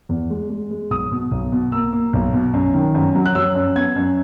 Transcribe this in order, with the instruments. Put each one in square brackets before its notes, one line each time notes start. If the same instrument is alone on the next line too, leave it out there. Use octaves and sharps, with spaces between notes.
[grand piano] E2
G#3
G#3
G#3
B1 D#6
B2
B1
B2
A#3 E6
A#3
B1
B2
F#2
D#3
F#2
F#3
F#6
F#3 E6
F#2
B3 G#6
F#2